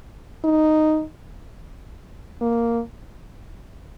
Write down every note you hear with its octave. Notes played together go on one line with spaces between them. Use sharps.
D#4
A#3